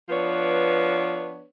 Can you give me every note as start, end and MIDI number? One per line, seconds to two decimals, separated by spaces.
0.10 1.44 53
0.10 1.44 59
0.10 1.44 62
0.10 1.44 71
0.10 1.44 73